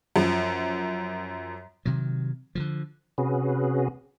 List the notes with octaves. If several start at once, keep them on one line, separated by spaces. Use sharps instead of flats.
F#2 F3
C3 D#3 F#3
D3 D#3 F3
C3 C#4 F#4 G#4 B4